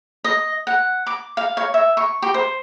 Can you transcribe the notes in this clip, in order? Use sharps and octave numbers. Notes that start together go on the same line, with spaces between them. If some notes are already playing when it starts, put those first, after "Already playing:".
D#5
F#5
D6
F5
C#5
E5
C#6
G4
C5